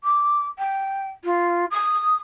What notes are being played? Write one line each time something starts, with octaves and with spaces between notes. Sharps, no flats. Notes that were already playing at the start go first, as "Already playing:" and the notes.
D6
G5
F4
D#6